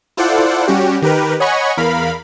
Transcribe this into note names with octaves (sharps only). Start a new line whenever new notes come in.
E4 F4 A4 C5 D5 F#5
G3 C#4 F#4 G4
D#3 G4 A#4 B4
C#5 D#5 F#5 G#5 B5 C#6
E2 A#4 F5 B5